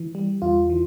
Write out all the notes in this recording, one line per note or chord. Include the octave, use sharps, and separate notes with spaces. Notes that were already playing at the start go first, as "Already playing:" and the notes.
Already playing: E3
G3
E2 F4
E3